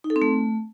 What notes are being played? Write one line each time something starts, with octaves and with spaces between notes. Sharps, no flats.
D#4
A4
C4
A3